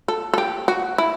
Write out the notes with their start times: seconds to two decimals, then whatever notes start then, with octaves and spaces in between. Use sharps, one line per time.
0.08 A4
0.34 A4
0.38 G4
0.68 F#4
0.98 E4